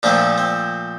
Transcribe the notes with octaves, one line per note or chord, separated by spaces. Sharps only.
A#2 F3 A3 C4 D4
C4